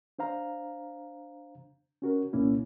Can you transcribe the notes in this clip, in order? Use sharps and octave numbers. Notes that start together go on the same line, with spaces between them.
D4 C5 F5 A#5
C#4 F#4 A#4
C2 A#2 A#3 C#4 E4